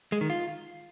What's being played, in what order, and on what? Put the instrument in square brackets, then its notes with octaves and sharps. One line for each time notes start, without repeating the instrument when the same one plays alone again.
[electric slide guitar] G#3
D#3
F4